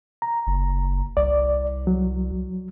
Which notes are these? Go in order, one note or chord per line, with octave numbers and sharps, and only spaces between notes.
A#5
F#1
C2 D5
F#3